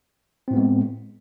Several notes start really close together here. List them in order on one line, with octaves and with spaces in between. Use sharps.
C4 A2 B3 G#3